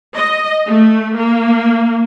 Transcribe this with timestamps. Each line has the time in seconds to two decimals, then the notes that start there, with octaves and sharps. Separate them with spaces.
0.16 D#5
0.67 A3
1.16 A#3